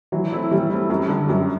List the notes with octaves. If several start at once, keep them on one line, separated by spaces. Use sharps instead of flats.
E3 F#3
A3 C4 E4
E3 G3
A3 C4 E4
F#2
D3 G3
F#2 F#3